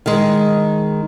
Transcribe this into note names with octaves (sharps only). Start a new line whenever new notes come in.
D#3 G#3